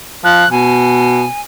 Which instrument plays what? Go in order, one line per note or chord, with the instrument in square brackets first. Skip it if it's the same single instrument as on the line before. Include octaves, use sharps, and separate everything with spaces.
[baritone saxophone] F3 [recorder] F#6
[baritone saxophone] B2 [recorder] G#5